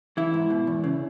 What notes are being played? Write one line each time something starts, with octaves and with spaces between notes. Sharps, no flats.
E3 E4
G#2
B2
E2
C#3